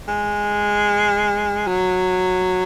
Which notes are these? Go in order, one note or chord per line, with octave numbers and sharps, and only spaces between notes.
G#3
F#3